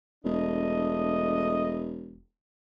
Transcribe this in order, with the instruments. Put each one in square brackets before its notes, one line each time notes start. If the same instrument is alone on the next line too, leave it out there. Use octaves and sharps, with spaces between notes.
[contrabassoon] E1 [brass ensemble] A3 D4 D#5